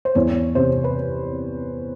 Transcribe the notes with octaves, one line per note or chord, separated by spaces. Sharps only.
C5
E2 C#5
C3 C5
B4